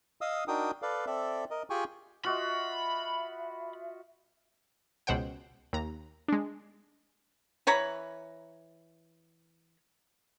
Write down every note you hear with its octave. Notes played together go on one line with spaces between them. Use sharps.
D#5 F5 D#6 E6
D4 D#4 F#4 A#4 G5 D#6
A4 B4 D5 F5
C4 A4 D5 E5
A#4 D#5
F4 G4 G#4 G5 G#5 C#6
F4 F#4 D#5 E5 B5
C#2 B2 C5 F#5 G5
D#2 A#5
G#3 D4
E3 C#5 A#5 B5